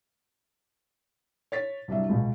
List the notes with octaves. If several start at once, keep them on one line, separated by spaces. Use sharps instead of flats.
C#5 A6 B6
C2 G2 F#3 G3 D4 E5
C#2 B2